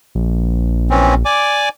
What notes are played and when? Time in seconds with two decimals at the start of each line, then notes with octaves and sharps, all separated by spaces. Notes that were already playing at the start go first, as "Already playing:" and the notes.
0.15 A#1
0.90 E3 C4 C#4
1.25 D5 G#5 D6